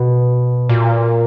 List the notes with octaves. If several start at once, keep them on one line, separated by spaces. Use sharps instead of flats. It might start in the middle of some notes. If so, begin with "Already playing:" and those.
Already playing: B2
A#2